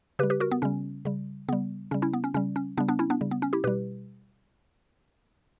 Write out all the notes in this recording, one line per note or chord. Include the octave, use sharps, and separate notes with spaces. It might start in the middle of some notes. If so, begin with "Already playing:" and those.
C#3 G3 G4 B4
G4 B4
F#4 A#4
B3
C#3 G3 C#4
C#3 G3
C#3 G3 B3
C#3 G3 C#4
C#4 E4
B3
C#4
C#3 G3 C#4
C#4
C#3 G3 B3 D4
B3 D4
C#4 E4
B3 D4
C#3 G3
B3
C#4
E4 G4
B2 G3 G4 B4